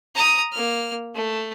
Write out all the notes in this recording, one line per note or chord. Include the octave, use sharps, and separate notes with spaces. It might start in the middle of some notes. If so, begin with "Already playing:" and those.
A#5 D#6
A#3 F6
A3